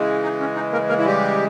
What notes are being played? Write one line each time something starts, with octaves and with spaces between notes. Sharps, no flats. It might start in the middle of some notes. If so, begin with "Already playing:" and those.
Already playing: C#3 E3 G#3
D#4
C#4
D#4
A#3 A#4
A#3 A#4
E4
G3 G4